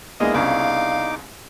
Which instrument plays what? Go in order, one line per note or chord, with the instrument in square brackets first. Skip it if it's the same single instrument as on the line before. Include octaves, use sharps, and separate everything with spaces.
[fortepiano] G#3 A#3 [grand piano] B3 D4 E4 [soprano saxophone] D#5
[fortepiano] C2 C#3 [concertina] D#4 D6 [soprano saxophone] F5